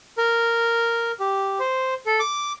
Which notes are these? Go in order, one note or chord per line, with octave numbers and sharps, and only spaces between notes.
A#4
G4
C5
A4
D6